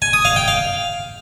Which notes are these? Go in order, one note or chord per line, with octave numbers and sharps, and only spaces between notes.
G#5
D#6
F5
G5
F5